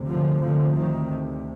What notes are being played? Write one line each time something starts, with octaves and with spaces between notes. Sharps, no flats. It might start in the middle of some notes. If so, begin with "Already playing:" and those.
Already playing: D2 C3
D3 F3
D3 F3
D#3